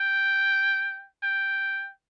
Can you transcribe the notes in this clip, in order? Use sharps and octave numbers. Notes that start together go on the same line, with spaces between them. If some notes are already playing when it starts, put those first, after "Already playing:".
Already playing: G5
G5